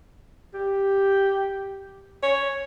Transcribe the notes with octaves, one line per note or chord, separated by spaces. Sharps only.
G4
C#5